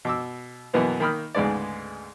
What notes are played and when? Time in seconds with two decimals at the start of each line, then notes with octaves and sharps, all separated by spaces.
0.05 B2 D6 E6
0.73 F#2 B2 E3 A#3 B3 E4
1.00 D#3 A#3 G5 B5 D#6 F6
1.35 D2 G#2 C#3 G#3 B3 D5